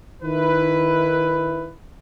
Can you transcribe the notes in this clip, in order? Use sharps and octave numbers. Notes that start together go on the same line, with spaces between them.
D#3 E4 B4